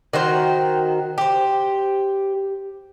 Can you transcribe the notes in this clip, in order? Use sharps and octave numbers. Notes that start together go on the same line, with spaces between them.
D#3 F#4 C5 G5
G4 C5